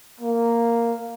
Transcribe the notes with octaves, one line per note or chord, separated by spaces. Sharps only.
A#3